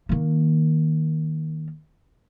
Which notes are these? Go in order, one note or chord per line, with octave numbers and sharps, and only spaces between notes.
D#3 A#3